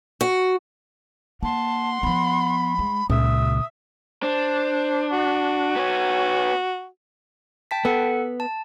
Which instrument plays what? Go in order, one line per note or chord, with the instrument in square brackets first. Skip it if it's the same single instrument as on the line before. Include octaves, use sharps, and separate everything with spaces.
[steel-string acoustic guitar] F#4
[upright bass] A#3 [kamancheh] F#5 C6 [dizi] A5
[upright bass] F3 B3 [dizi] B5
[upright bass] G#3
[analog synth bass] C#2 [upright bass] A#2 [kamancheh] E5 [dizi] D#6
[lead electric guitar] D4 [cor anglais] C5
[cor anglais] F#4
[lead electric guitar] B3 C#5
[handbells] G5 A5 B6
[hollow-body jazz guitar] B3 [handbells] A4 F#5
[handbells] A5